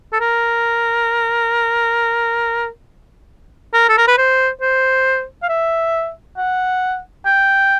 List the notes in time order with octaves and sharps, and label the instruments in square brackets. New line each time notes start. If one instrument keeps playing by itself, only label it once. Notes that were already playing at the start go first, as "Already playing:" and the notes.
[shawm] A4
A#4
A#4
A4
A#4
B4
C5
C5
F5
E5
F#5
G5